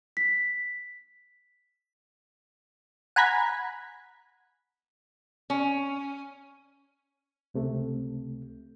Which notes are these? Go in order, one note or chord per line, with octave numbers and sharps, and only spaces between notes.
B6
F#5 G#5 A#5 B5 G#6 B6
C#4
C#2 C3 A3